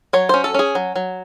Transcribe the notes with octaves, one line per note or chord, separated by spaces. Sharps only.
F#3 C#5
C#4 C5
A4
C#4 G#4
F#3
F#3